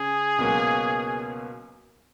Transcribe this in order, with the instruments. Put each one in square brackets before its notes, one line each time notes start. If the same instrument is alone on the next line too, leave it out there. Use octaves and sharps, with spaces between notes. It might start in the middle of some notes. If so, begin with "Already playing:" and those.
Already playing: [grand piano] C#3 C#4 [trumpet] G#4
[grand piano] C#2 B2 F#3 A#3 C#4